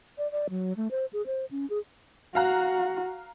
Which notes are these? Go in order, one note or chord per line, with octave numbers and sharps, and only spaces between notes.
D5
D5
F#3
A3
C5
G#4
C5
C#4
G#4
F#4 F5 A#5 F#6